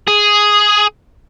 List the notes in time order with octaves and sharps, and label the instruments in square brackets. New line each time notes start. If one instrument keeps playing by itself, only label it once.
[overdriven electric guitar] G#4